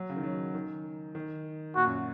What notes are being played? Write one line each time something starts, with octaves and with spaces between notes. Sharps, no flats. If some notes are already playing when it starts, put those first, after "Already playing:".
Already playing: F#3
C#3
D#3
F#3
D#3
D#3
A#2 F#4
F#2